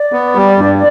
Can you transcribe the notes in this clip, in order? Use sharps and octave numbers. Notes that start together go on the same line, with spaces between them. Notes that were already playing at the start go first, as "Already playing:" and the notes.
Already playing: D5
B3
G3
G2